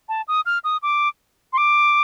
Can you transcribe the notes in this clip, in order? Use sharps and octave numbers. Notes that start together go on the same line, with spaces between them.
A5
D#6
F6
D#6
D6
C6
D6